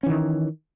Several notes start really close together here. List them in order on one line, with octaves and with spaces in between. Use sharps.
C#4 E3 D#3